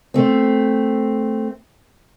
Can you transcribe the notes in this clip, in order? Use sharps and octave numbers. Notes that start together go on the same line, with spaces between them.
A3 C4